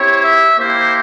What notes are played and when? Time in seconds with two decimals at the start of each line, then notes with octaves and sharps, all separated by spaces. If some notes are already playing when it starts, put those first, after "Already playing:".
Already playing: C4 E4 G4 C#5
0.24 E5
0.58 A#3 E4 G4 C5